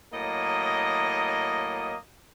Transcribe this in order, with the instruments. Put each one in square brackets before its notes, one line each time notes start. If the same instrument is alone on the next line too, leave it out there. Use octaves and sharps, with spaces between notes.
[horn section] A2 F#3 A#3 D#5